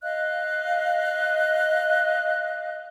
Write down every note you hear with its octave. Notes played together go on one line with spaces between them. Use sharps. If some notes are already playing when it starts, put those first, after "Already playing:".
D#5 F5 F#6